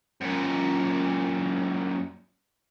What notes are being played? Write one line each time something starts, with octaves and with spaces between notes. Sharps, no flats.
F#2 A#2